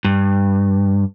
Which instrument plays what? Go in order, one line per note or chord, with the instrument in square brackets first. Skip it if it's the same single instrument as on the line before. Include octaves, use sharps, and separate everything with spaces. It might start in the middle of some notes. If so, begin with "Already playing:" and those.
[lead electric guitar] G2